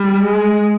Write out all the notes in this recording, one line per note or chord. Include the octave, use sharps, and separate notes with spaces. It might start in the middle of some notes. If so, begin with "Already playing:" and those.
Already playing: G3
G#3